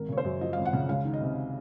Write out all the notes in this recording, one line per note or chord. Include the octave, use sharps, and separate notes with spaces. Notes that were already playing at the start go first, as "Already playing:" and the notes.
Already playing: G#1 A#4
C#3 C#5
C5
F#2
F3 D#5
G#1 F5
F#5
C#3
C#2 F5
D#3
D#5
C3